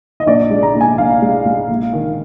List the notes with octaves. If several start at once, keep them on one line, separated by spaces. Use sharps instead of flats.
D#5
A#1 D5
G#3
A#5
A#1
G#5
A#1 F5
G#3
G#3
A#1
D#3